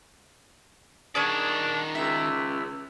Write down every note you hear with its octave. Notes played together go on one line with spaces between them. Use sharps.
D#3 D4 G#4 C#5 D5 D#6
C#2 E5